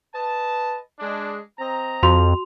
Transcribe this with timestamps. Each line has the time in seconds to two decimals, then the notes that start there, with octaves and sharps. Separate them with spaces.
0.13 B4 D#5 A5
0.99 G#3 D4
1.58 C4 D#5 A#5
2.03 F2 F#4 C6 F7